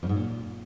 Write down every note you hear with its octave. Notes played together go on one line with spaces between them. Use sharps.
F2
G#2
A#2